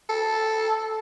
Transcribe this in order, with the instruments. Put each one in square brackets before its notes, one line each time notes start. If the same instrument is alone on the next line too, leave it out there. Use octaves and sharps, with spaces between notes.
[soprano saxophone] A4